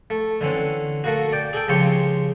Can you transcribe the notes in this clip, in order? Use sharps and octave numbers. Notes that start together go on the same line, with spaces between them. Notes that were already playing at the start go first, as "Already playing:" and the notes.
A3
D3 E3 C4 C#4
A3 A#3 F#4
D5 G5
G#4 A4 G5
C#2 C#3 F3 C4 G4 C#6